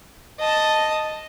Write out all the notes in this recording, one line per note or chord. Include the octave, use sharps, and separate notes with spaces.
D#5 A5